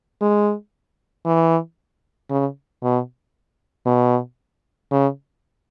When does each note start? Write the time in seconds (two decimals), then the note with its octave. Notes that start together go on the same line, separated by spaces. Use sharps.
0.21 G#3
1.26 E3
2.30 C#3
2.83 B2
3.86 B2
4.91 C#3